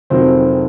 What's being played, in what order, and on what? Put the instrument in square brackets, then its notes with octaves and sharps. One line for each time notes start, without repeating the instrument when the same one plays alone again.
[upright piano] F1 F2 D#3 F#3 [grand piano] C4